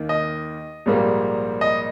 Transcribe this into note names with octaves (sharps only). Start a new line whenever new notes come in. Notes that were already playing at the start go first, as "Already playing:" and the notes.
Already playing: D#2 D#3 A#3
D#5
A#1 G#2 G3 A#3
D#5